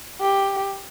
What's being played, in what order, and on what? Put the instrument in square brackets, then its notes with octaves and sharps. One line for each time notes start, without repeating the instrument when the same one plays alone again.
[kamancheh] G4